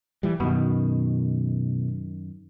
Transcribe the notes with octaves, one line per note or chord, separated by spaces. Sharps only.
E3 G3
F#2 B2 D#3